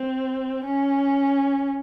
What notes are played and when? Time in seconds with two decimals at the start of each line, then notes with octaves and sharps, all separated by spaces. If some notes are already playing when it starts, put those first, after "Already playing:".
Already playing: C4
0.65 C#4